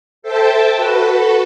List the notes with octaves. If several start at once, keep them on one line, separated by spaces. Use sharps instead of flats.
A4 C5 E5 G5 A5
F#4 A4 B4